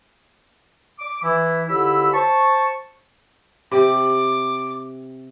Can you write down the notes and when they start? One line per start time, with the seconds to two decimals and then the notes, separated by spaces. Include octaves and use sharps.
0.99 D6
1.23 E3 E4
1.68 C#2 D3 E4 G4 B5 E6
2.13 C5 A5 C#6
3.72 C3 G4 D6